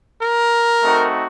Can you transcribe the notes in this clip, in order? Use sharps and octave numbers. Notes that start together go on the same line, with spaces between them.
A#4
A3 C4 D#4 F#4